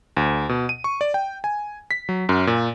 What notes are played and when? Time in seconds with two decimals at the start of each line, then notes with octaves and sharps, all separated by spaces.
0.17 D2
0.49 B2
0.69 D#7
0.84 C#6
1.01 D5
1.14 G5
1.44 G#5
1.91 B6
2.09 F#3
2.29 F#2
2.47 A#2